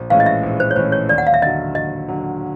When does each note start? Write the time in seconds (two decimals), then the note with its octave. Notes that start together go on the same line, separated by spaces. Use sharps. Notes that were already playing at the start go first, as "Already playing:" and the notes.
Already playing: A#1
0.10 A2 E3 G#3 C#4 F5
0.20 D#5
0.26 E5
0.43 A#1
0.60 C5
0.71 C#5
0.76 A2 E3 G#3 C#4 C5
0.92 C#5
1.09 D#2 D5
1.18 F#5
1.27 F5
1.34 E5
1.42 D3 F#3 D#5
1.75 D#2 D#5
2.08 D3 F#3